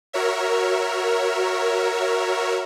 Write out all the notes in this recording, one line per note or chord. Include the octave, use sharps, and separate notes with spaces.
F#4 A#4 C#5 E5